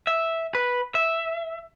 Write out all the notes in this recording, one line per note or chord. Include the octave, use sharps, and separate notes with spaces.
E5
B4
E5